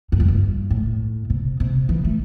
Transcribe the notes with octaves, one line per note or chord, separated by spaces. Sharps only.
G2
E2
G2
A2
C3
C3
E3
A3